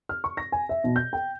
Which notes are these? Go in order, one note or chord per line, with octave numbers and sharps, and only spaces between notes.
F6
C#6
A#6
G#5
E5
B2
G6
G5